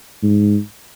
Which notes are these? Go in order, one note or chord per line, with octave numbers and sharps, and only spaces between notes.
G#2